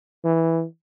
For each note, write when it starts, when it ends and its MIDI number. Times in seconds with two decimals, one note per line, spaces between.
0.25 0.64 52